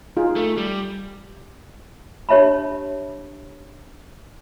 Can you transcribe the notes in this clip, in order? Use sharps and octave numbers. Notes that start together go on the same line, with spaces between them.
D#4 F4 G#4
A3
G3
D4 G4 C#5 E5 A5 B5